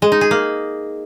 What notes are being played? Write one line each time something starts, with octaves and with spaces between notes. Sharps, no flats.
G#3
D#4
G#4
A#3